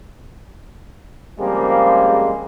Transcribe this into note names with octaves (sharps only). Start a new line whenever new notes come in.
C#3 F3 G3 G#3 A#3 C4